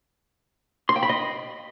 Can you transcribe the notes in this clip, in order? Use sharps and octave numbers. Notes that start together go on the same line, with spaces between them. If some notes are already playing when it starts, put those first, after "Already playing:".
C6
G5
B5
D#5